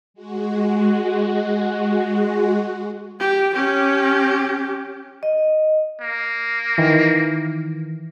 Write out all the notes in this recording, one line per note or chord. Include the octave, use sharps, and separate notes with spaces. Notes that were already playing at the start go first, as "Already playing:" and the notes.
G#3 F#4
G4
C#4 G4
D#5
A#3
D#3 E3